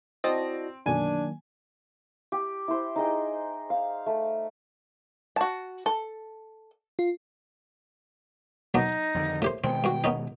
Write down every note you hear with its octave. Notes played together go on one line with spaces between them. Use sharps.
C4 E4 F#4 D5 D#5 A5 A#6
F#2 B2 D3 D#3 F#3 A#3 D4 G#5
G4
E4 C5
D#4 G#4 D#5 G5
F5
A3 B5
F#4 A5
A4
F4
F#3 B3 D4 D#4
F2 D3 D#3
A2 G4 C5
B2 D#3 G#3 C4 G5
G2 F#4
B3 C#4 D#4